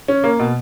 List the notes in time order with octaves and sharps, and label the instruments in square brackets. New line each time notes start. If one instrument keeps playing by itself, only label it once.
[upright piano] C#4
A#3
B2